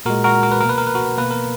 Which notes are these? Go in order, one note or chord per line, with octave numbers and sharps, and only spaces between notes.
A#2 G#3 F#4 A#4
F#4 A#4
A#4
B4
B2 A#3 A#4
B4
A#4
B4
F#4 A#4
B2 A#3 B4
A#4